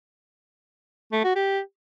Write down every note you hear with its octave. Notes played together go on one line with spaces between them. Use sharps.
A3
F#4
G4